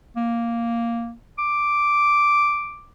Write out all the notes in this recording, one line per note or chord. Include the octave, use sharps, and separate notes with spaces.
A#3
D6